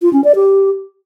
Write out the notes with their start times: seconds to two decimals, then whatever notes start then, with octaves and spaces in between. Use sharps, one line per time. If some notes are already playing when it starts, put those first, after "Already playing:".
0.02 F4
0.13 C#4
0.24 D5
0.35 G4